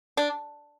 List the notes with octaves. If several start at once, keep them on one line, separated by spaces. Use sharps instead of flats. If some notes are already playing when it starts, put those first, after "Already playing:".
D4